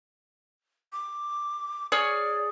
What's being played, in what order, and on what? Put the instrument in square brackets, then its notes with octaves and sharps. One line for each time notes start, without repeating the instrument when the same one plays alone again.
[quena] D6
[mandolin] G#4 C#5 F6 [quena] D5